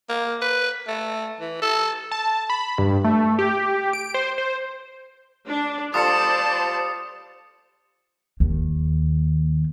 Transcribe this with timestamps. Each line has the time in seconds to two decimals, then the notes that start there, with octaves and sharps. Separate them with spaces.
0.09 A#3
0.42 B4
0.88 A3
1.40 E3
1.62 A4
2.11 A5
2.50 B5
2.78 G2
3.04 A3
3.39 G4
3.93 D7
4.14 C5
4.38 C5
5.48 D4
5.94 G3 F4 A4 C5 D5 A5 D#6 C#7
8.40 D#2